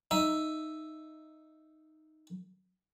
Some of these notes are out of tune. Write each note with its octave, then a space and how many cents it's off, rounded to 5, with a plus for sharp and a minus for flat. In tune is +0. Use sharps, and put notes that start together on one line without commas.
D#4 +0 E5 +0